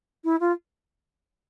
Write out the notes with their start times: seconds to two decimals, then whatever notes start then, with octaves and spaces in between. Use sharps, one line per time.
0.24 E4
0.40 F4